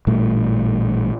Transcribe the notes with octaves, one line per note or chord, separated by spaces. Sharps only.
A1 A#2 G3 A3